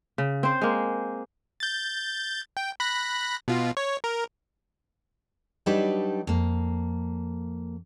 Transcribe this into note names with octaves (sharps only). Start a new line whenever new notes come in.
C#3
C4 C5
G#3 A#3
G6 A6
G5
B5 F#6 A#6
B2 F4
C#5
A#4
F#3 G3 D4 D#4 G4 B4
F2 A#3